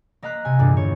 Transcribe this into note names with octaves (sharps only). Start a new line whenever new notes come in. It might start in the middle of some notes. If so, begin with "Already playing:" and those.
A#3 D#5 F5 A#5 F#6 B6
C3 G#5
E2 G2 A#2 D3
C#5